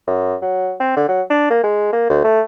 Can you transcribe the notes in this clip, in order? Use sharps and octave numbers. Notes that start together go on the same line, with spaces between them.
F#2
F#3
C4
D3
F#3
D4
A#3
G#3
A#3
D2
A3